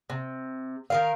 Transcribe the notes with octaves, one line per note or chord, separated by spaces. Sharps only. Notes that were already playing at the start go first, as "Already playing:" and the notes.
C3
D#3 A#4 F5